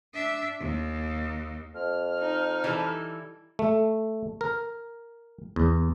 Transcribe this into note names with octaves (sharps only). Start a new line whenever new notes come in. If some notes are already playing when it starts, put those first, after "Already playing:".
D4 E5
D#2
F2 F6
D#4
E3 G3 A4
A3
A#4
E2